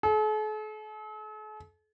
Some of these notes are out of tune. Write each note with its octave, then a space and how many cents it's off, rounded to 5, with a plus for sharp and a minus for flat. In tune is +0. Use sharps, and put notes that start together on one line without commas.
A4 -45